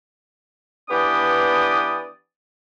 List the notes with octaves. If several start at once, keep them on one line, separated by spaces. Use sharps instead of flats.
E3 B3 D4 G4 D5 D#6